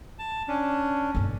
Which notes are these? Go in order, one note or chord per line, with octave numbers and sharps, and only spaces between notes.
A5
C#4 D4
G1 B2